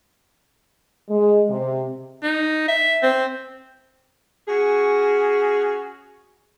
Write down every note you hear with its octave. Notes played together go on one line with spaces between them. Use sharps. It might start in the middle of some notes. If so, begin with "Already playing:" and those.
G#3
C3
D#4
E5
C4
C#4 F#4 G#4